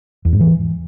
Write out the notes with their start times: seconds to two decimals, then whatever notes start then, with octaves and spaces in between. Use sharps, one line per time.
0.25 E2
0.33 G#2
0.40 E3